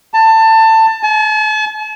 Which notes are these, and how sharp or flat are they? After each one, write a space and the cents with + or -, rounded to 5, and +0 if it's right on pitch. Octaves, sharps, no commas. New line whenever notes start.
A5 +20
A5 -45